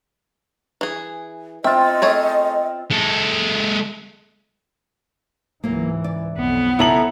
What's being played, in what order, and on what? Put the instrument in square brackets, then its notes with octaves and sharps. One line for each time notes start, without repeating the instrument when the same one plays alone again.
[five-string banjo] E3 G#4
[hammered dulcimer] C4 F4 [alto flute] D#5 [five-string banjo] E5
[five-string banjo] A3 G#4 C#5
[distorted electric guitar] G#3 A4
[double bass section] C#2 G#2 E3 [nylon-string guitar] F#3 A#3
[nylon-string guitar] D5
[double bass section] B1 F2 [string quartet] B3
[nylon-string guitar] C#3 A4 [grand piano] E4 A#5 F#7